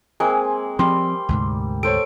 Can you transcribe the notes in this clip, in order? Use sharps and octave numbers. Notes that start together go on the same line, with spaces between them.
G#3 A#3 C4 G#5
F3 G3 C4 C6
D2 G#2 C3
A4 C5 C#5 D7